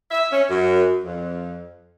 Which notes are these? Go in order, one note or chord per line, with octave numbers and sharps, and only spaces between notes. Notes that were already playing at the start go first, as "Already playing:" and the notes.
E5
C#4
F#2
F2